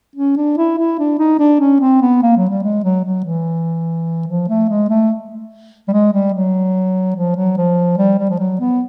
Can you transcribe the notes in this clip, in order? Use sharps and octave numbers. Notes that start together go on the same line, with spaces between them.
C#4
D4
E4
E4
D4
D#4
D4
C#4
C4
B3
A#3
F#3
G3
G#3
F#3
F#3
E3
F3
A3
G#3
A3
G3
G#3
G3
F#3
F3
F#3
F3
G3
G3
F3
F#3
B3